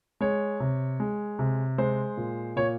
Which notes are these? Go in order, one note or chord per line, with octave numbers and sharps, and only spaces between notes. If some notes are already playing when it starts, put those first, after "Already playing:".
G#3 C#5
C3
G#3
C3
G#3 C5
A#2
A#2 C#5